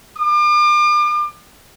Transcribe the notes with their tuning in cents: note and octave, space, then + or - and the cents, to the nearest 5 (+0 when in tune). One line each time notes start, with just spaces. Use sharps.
D6 +40